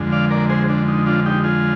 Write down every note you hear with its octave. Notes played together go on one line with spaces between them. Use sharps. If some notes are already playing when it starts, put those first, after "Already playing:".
Already playing: F2 D3 G#3
D5 F5
A#4 D5
G#4 C5
D4
D#4
D4 F4
D#4 G4
F4 G#4